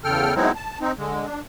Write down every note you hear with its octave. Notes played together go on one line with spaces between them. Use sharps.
E2 C#3 A4 G5 F6
F#3 G#3 B3 C4 D#4 E4
A5
C4 D#4
D3 G#3
D4